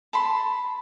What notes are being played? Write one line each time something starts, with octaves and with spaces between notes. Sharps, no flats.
A5 B5 C6